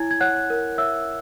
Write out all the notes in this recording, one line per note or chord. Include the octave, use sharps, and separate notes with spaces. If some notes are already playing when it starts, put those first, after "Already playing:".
Already playing: E4 C#5 G#5 G#6
G#6
C#5 F#5 F#6
A#4
C#5 E5 E6